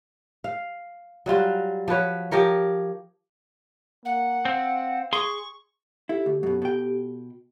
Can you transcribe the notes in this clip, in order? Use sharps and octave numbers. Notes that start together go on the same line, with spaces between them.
F5
F#3 G3 F4 F#4
F3 F#4 B4 C#5
F3 G4 A#4 C#5
A#3 F#5
C4 F5
G#4 C6 C#6
E4 G4 A4
D2
F#2 B2
B2 G5